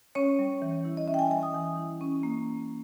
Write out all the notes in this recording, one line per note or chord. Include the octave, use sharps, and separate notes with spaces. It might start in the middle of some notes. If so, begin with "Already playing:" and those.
C#4 C#5
G3
E3
E4
D#5
C#4 E5
G5
G#5
G3 G#5
D#6
E3
E4
C#4
A#3